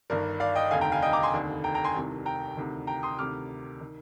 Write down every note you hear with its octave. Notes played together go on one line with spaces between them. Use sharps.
G1 G2 D#3 A#4 D5
D5 F5
D#5 G5
F1 D#2 D3 F5 G#5
G5 A#5
F5 G#5
D#5 G5
A#5 D6
G#5 C6
F1 D#2 D3
G5 A#5
G5 A#5
G#5 C6
C2 C3 D#3
G5 A#5
D2 C3 D#3
G5 A#5
C6 D#6
D2 C3 D#3 D6 F6
D#3